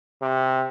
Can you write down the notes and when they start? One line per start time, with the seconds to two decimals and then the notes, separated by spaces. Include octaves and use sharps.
0.22 C3